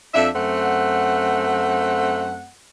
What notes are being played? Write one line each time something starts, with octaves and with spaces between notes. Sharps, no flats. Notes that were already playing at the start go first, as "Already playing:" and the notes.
F2 D4 E5
F#2 A3 C4 F#5